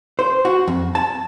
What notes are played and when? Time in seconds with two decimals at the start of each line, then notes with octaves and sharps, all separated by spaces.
0.19 C5
0.45 F#4
0.68 F2
0.95 A5